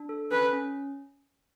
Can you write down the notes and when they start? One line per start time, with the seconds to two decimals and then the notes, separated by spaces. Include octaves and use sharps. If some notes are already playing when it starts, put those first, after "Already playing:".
Already playing: D4
0.09 A4
0.31 C#4 B4
0.53 C#4